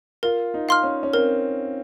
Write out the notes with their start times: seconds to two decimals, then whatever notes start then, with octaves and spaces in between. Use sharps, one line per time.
0.23 F4 A#4
0.54 D#4
0.69 F5 C6 F6
0.83 C#4
1.03 C#4
1.13 C4 A#4